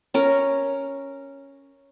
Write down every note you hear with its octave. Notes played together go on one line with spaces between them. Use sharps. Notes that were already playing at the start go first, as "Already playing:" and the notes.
C#4 A#4